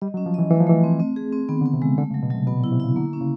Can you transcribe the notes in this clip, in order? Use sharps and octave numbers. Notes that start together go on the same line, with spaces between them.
G3 D#5
F#3
C#4
F3
E3 D#5
E3 A3
F3
E3 A3
C4
C4
G#4
C4
D#3 B3
D3
B3
C3
C#3 G#3
D3 A3
C#3
F#3
B2
C3 F#3
B2 B3
A#2
E4
C3
C#3 E4
D3 A#3
C#4
C#3